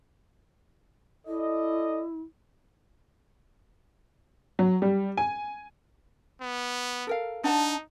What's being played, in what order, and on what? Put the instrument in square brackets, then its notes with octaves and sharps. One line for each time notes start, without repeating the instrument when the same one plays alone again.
[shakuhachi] E4 [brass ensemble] A4 D5 D#5
[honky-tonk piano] F#3
G3
G#5
[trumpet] B3
[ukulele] A4 A#4 F5
[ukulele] D4 F#5 A5 [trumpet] D#4